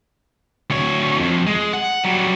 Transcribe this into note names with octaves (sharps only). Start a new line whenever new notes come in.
D2 C#5
F2
G#3
F#5
F#3 G3